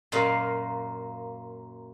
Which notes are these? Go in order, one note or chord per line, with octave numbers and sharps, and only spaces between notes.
F#2 A#2 A#3 F4 F5